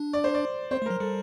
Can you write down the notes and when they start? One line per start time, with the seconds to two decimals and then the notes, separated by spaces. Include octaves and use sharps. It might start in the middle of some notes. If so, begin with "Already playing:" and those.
Already playing: D4
0.13 D5
0.24 C5
0.34 D5
0.71 C4 C5
0.82 A3
0.86 F#3 A#4
1.00 G3 A4